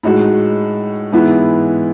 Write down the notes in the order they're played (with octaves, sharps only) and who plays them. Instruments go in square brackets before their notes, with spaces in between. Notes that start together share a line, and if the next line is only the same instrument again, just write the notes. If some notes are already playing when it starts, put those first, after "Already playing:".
[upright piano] A2 G#3 D#4 F#4
G#2 E3 G#3 B3 E4